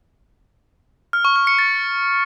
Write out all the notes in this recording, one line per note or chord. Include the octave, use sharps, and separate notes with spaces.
F6
C#6
F6
C#7
A6